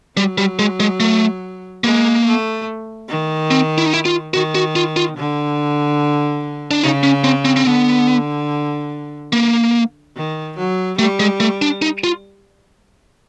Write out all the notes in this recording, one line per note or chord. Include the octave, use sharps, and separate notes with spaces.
F#3 G3
G3
G#3
G#3
A3
G#3 A#3
A3
D#3
C4
E4
D#4
E4
F4
D#3 F#4
F#4
F4
F4
D3
D4
C#3 D#4
C#4
C4
C4
C4
D3 B3
A#3
D#3
F#3
G3 A3
G#3
A3
D4
D#4
F4